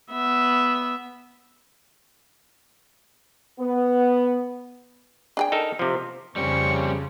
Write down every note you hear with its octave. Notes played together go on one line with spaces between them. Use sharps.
B3 E5
B3
D4 G#4 G5
D#4 A4 A#4
C3 F3
F2 C#3 G3 C4 C#4 C#6